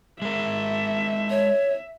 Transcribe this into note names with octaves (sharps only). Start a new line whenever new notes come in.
G#3 A#4 E5
C#5